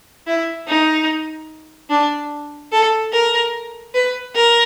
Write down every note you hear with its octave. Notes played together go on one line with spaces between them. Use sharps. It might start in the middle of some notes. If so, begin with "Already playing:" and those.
E4
D#4
D4
A4
A#4
B4
A#4